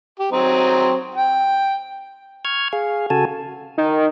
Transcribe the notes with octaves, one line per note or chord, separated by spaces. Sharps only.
G4
F#3 C4 D#4
G5
C#6 F6 G#6
G#4 F5
C#3 F#4 A4 G#5 A5
D#3